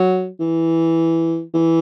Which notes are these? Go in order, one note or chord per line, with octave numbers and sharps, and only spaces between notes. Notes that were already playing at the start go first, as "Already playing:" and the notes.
Already playing: F#3
E3
E3